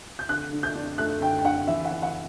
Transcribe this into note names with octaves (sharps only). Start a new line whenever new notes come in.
G6
D3 F#6
D3
G6
D4
A3 F#6
D3 G5
G5
D3 F#5
E3 E5
F#5
E3
F#5